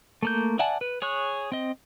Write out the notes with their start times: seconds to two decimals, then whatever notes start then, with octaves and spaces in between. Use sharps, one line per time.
0.23 A3 A#3 G6
0.59 D5 E5 F#5 G#5 A5
0.81 B4
1.02 G#4 C#5 C#6 F#6
1.52 C4 D#5